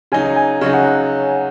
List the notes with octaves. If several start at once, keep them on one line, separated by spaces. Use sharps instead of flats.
C#3 F#3 D#4 G#5
G#5
C#3 F#3 D#4 C#5
F#5
F#5